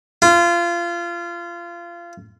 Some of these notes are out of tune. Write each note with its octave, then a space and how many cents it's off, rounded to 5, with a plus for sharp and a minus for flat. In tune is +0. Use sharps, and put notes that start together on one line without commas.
F4 -25